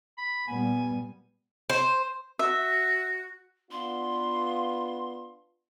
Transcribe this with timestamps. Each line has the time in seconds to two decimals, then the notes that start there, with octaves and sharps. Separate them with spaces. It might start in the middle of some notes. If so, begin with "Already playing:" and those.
0.18 B5
0.48 A#2 G3 B3 G#5
1.70 C5
2.39 F#4 E5
3.71 B3 D4 F4 C6